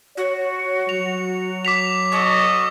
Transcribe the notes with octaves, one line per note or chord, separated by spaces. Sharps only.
F#4 C#5
F#3 F7
D6 B6 F7
F#4 A4 D#5 C#6